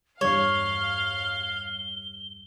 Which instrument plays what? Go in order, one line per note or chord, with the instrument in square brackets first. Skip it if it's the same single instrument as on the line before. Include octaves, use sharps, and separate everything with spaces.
[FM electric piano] E2 G2 G3 [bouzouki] C#5 [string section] F5 [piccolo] G7